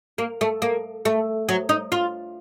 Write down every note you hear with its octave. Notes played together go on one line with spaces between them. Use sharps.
A#3
A3
A#3
A3
F#3
D#4
F4